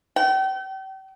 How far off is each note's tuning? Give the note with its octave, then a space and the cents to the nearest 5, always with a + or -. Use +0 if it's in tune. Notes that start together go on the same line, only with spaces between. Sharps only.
G5 -40